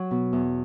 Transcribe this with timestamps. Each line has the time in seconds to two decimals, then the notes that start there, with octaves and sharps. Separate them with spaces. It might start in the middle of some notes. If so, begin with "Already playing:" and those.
Already playing: F#3
0.11 B2
0.33 E2